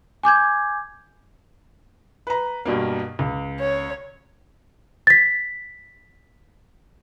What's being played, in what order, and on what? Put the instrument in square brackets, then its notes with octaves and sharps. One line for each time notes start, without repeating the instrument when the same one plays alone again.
[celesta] G#5 D6 G6 G#6
[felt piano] B4 A#5
G2 B2 A#3
C#2
[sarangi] C#5
[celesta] A6 B6